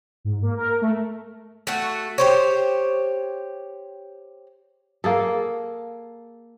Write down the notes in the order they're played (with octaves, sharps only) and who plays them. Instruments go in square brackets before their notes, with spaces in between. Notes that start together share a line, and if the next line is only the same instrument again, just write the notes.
[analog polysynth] G#2
A#3
A#4
A3
[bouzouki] A3 F#4
G4 C5 C#5
[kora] A#3 G#4 A4